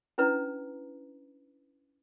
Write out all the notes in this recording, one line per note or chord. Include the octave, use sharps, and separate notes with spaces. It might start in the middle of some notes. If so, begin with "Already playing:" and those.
C#4 D4 E4 B4 A#5